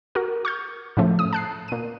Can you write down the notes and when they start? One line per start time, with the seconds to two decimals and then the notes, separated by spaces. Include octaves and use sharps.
0.15 F#4 A#4
0.45 C#6 F6 G6
0.97 A2 C#3 F3 A3
1.19 D#6
1.33 A5 F#6 C7
1.68 A#2 D#7